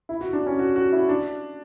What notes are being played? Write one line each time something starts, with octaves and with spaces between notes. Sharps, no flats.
E4
F#4
D4
C#4
F#4
F#4
E4
D4